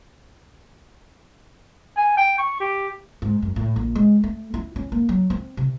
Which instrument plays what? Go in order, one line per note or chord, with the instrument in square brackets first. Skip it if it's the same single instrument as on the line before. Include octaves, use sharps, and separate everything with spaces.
[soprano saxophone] G#5
G5
C#6
G4
[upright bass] G#2
F#2
A2
A#1
G#3
A3
E4
C#4
A#3
F#3
C4
C3